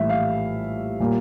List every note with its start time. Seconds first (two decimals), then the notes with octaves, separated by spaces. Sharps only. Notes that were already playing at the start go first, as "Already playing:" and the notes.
Already playing: A#1 A2 E3 G3 E5
0.09 F5
1.00 A#2 G3 A#3